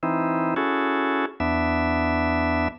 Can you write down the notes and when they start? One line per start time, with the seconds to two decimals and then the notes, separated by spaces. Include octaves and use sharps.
0.03 E3 C4 D#4 E4
0.56 C#4 E4 F#4 G#4 A4
1.40 E2 B3 D4 E5